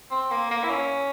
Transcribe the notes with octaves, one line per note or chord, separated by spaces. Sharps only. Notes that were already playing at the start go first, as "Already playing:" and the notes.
C4
A#3
A#3
E4
C#4